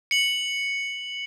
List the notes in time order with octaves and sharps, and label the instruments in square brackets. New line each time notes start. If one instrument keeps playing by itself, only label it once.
[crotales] C#7 F#7